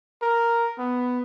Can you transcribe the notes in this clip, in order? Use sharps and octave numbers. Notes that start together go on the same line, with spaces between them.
A#4
B3